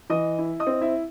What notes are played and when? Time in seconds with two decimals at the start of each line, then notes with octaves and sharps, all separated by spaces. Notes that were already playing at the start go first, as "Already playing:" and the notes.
0.10 E3 D#5 D#6
0.39 E4
0.60 D#5 D#6
0.67 C4
0.81 E4 E5